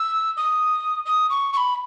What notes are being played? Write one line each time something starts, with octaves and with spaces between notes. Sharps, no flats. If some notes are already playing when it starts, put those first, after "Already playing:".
Already playing: E6
D#6
D#6
C#6
C#6
B5